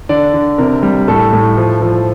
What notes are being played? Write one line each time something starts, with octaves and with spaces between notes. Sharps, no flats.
D3 D5
D3
C3 A#4
G3
A2 A4
A2
F3
F3